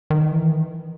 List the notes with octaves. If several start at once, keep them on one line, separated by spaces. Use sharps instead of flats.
D#3
E3